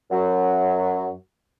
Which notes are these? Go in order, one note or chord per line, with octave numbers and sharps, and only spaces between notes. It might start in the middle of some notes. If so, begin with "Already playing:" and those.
F#2 F#3